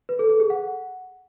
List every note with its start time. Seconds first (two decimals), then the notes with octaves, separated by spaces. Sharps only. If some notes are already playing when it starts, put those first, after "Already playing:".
0.09 B4
0.19 A4
0.30 A4
0.40 G#4
0.50 F#5